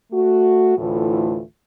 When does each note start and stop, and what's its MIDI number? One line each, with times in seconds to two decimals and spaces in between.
0.11 0.77 57
0.11 0.77 66
0.77 1.41 38
0.77 1.41 45
0.77 1.41 52
0.77 1.41 57
0.77 1.41 65